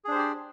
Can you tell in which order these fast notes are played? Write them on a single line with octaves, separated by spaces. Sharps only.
G#4 D4 C5 G4 D5